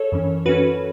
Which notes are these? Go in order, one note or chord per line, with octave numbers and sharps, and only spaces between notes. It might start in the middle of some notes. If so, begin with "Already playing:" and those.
Already playing: A4 C#5
F#2 E3 C#4
F#2 E3 C#4 F#4 B4